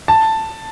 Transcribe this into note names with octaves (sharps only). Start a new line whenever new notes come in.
A5